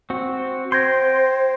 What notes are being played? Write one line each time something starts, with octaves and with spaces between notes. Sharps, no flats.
C4 F#4
C5 G5 C6 G6 G#6 A#6